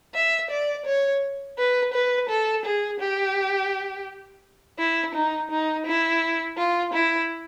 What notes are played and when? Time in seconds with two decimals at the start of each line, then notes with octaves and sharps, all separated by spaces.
0.14 E5
0.50 D5
0.86 C#5
1.58 B4
1.93 B4
2.29 A4
2.65 G#4
3.00 G4
4.79 E4
5.15 D#4
5.51 D#4
5.86 E4
6.57 F4
6.94 E4